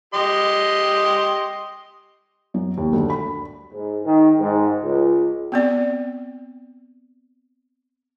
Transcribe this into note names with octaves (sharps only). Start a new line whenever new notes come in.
G4 D#5 C6
F#2
D#2
D2
B5
G#2
D#3
G#2
C#2
B3 C4 D5